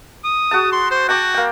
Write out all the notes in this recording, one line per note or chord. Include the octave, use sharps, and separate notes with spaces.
D#6
F#4 G#4 A5
C6
C5
F#4 G5 A5 D6
A#3 G5